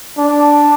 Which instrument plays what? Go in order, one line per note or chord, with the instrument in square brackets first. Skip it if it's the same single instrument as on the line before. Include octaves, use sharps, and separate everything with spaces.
[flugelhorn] D4